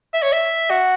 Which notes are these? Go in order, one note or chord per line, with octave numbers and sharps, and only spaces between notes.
E5
C#5
E5
F#4